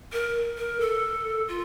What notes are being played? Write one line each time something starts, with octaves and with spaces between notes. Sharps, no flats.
A#4
A#4
A4
F4